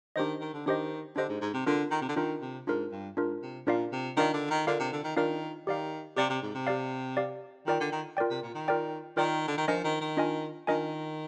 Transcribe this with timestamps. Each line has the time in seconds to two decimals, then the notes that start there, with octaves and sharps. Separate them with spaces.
0.16 D#3 D4 G4 C5 D#5
0.41 D#3
0.54 D3
0.66 D#3 D4 G4 C5 D#5
1.16 D3 D4 G4 C5 D#5
1.29 G#2
1.41 G#2
1.54 C3
1.66 D3 D4 F4 A#4
1.91 D#3
2.02 C3
2.09 D3
2.16 D#3 D4 F4 A#4
2.41 C3
2.67 G#2 D4 F4 A#4
2.91 G2
3.17 G#2 D4 F4 A#4
3.42 C3
3.66 A#2 D4 F4 A#4 D5 F5
3.92 C3
4.17 D#3 D4 F4 A#4 D5 F5
4.34 D3
4.51 D#3
4.67 D3 D4 F4 A#4 D5 F5
4.80 C3
4.92 D3
5.04 D#3
5.17 D#3 D4 F4 A#4 D5 F5
5.67 D#3 G4 D5 F5
6.17 C3 G4 D5 F5
6.30 C3
6.42 G#2
6.54 C3
6.67 G4 D5 F5
7.17 G4 D5 F5
7.67 D#3 F4 A#4 D5 G5
7.80 D3
7.92 D#3
8.17 F4 A#4 D5 G5
8.30 C3
8.43 A#2
8.54 D#3
8.68 F4 A#4 D5 G5
9.17 D#3 F4 A#4 D5 G5
9.48 D3
9.58 D#3
9.68 F3 D4 F4 A#4 D#5 G#5
9.84 D#3
10.01 D#3
10.17 D4 F4 A#4 D#5 G#5
10.67 D#3 D4 F4 A#4 D#5 G#5